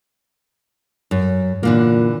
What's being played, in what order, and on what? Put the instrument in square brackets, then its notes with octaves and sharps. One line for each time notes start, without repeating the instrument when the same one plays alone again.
[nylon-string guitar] F#2
[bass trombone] A#2 [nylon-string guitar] D3 E3 A#3